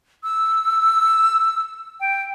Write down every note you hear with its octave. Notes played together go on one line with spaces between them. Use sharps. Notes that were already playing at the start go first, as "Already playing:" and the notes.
E6
G5